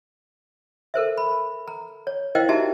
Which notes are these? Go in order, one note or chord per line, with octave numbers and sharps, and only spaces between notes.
A4 A#4 C5 E5
B5
A#5
C#5
E4 A#4 C5 D#5 F5 G5
D#4 F#4 G4 E5 A5 A#5